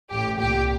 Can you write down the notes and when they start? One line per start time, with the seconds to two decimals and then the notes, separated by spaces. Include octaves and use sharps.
0.11 A1 A2 G4
0.39 C2 A#2 G4